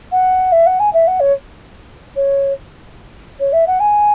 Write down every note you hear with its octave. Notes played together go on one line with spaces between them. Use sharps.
F#5
E5
F#5
G#5
E5
F#5
C#5
C#5
C#5
E5
F#5
G#5